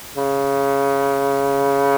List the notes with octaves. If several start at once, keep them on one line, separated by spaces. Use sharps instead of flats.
C#3